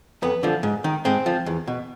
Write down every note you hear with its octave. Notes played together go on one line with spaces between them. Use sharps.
F2 B3
D3 F3
G#2
D#3
G#2 C4
F3
E2
B2